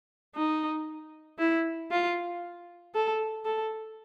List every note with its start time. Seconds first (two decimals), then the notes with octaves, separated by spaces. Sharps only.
0.36 D#4
1.38 E4
1.91 F4
2.94 A4
3.45 A4